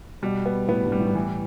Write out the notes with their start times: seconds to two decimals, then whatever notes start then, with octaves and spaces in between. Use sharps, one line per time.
0.22 B2 G3
0.46 B3
0.68 A2 B3
0.85 G2
0.92 G3
1.00 A2
1.07 G2
1.15 A2 E3